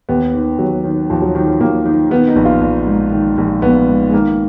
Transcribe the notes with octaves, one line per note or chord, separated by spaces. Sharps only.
D#2 B3
D#3
D#2 F#3
D#3
D#2 F3
F#3
D#3 F3
F#3
D#2 A#3
D#3
D#3 B3
D#4
A#1
F4
A#1
G#2
D#3
A#1
A#1 B3
G#2
G#3
D#3 A#3